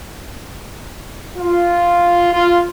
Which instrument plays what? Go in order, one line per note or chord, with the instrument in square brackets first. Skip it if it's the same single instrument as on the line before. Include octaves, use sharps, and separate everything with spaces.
[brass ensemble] F4
F4